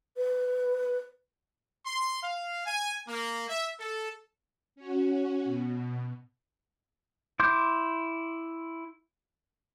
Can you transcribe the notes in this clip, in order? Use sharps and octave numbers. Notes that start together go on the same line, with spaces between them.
B4
C6
F5
G#5
A#3
E5
A4
C#4 F#4
B2
E4 C6 D6 G6